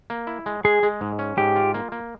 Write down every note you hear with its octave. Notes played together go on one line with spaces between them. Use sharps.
A#3
E4
G#3
G#3 G#4
G#3
G#2
C#4
G#2 G4
F4
A#3
A#3